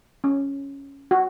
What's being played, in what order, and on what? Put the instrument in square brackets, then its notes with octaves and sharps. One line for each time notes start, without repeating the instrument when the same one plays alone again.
[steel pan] C#4
F#4